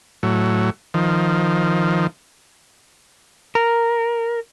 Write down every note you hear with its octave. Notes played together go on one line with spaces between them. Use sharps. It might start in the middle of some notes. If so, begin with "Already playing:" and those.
A2 F#3
D#3 F3
A#4